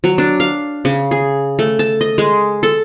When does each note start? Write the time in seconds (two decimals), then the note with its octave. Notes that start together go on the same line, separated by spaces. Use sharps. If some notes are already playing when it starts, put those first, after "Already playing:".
0.04 F#3
0.18 D4
0.40 F5
0.85 C#3
1.11 G#4
1.59 A3
1.79 A5
2.01 D#5
2.18 G#3
2.63 A4